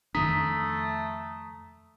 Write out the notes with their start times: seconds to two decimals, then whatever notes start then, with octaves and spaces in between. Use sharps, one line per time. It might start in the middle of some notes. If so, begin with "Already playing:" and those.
0.15 F2 D#3 A3 D4 A#5 D#6 B6